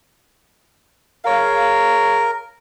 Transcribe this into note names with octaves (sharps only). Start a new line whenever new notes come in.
G#4 A#4 C#5 F5